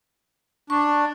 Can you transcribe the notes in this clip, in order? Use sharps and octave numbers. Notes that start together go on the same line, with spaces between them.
D4 C#6